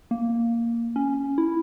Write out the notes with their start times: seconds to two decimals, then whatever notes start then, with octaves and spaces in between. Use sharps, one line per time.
0.11 A#3
0.96 C#4
1.38 E4